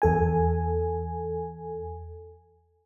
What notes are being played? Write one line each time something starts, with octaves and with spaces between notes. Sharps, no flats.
E2 A4 G#5